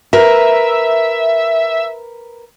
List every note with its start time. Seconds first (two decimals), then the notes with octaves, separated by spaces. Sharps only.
0.13 A#4 B4 E5